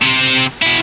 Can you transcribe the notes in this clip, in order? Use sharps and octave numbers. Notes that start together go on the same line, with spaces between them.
C3 C4
B2 E4